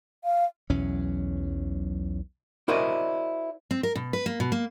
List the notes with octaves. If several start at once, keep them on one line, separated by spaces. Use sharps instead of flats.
F5
B1 E2 F#3 C#4
E4 F#4 A#4 C5 D5 D#5
C4
A#4
B2
B4
A#3
B2
A#3